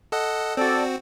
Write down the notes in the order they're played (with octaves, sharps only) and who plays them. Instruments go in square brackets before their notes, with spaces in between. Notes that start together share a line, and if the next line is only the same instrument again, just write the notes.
[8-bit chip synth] A4 D#5 F#5
[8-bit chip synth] C4 F#4 [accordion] A4 D5